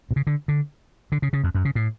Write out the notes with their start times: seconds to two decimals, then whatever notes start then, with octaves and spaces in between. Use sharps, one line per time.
0.11 B2
0.16 C#3
0.27 D3
0.48 D3
1.12 D3
1.22 C#3
1.33 C#3
1.44 F2
1.55 F#2
1.65 C#3
1.75 A2